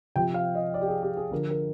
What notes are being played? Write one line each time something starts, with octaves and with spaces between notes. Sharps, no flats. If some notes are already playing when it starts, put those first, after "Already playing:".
C3 F3 G5
F5
D#5
D5
G4
G#4
G4
G#4
D3 F3 A#4
A#4